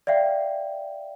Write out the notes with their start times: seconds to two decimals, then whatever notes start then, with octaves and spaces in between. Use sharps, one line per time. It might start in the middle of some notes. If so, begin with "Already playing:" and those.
0.07 D5 E5 F5 G5